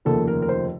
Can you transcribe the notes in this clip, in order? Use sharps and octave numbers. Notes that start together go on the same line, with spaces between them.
F1 D#2 C#3 F3 A#3 A4
A#4
A#4
C5